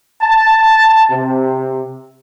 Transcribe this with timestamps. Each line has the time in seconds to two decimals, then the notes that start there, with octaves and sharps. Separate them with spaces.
0.22 A5
1.11 C3